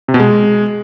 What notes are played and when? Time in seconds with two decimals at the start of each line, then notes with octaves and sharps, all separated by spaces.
0.08 C3
0.14 B2
0.20 G#3